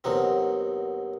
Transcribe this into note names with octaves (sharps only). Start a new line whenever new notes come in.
D#2 B2 F#3 C4